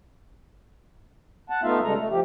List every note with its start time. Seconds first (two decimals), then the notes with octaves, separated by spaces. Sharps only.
1.50 F#5 A5
1.63 A3 B3 D#4 F4 E5 F5
1.83 C#3 G3 G#3 A4 A#5
1.97 A3
2.10 F3 G4